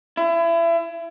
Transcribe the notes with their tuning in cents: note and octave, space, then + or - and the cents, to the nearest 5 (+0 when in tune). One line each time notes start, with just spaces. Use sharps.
E4 +30